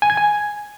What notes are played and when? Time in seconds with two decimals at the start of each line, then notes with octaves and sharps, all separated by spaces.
0.02 G#5
0.10 G#6
0.17 G#5